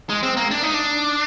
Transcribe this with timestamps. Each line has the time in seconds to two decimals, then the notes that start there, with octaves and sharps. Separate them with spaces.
0.09 G#3
0.23 C4
0.37 A#3
0.51 D4
0.63 D#4
0.74 D4